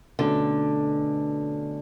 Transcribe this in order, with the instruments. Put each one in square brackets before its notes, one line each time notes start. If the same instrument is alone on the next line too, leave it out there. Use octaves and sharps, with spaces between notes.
[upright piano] B2 A3 C#4 [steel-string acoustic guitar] D3